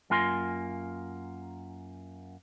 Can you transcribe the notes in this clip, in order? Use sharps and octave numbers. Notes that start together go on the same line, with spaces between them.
F#2 A#3 F4 G#5 C6